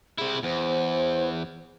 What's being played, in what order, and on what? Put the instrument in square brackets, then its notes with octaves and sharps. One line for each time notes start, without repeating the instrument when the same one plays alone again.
[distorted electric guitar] C3 E4 [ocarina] G#4
[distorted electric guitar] E2 [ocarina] C5